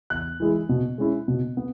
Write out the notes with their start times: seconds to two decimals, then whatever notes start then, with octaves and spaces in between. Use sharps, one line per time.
0.10 E2 F#6
0.40 E3 G#3 E4
0.69 B2
0.98 G#3 C#4 E4
1.28 B2
1.57 B3